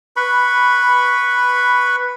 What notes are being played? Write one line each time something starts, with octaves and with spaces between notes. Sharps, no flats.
B4 B5 C#6